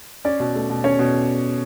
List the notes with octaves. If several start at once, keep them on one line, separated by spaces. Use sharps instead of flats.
C#4 D5
B2
A3
B2
C#4 C#5
B2